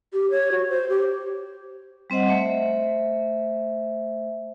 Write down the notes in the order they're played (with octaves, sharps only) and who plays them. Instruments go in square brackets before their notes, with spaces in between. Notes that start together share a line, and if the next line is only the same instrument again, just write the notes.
[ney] G4
C#5
F#4
C5
G4
[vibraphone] G3 C4 C5 D#5 F#5
A3 C5 E5